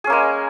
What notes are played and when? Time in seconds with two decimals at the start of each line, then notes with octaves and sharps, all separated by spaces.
0.04 G#4
0.07 C#4
0.10 A#3
0.12 G#3